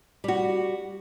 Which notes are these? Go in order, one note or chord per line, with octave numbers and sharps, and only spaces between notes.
G3 F#4